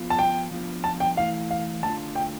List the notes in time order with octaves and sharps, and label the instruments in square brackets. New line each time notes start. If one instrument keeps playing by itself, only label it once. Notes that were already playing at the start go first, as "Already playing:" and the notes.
Already playing: [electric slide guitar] F3 B3 F4
[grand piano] A5
G5
[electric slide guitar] F3 B3 D4 F4
[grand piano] A5
G5
[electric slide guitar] E3 A3 E4 [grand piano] F5
[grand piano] F5
[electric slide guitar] D3 A3 D4 F4 [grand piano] A5
[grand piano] G5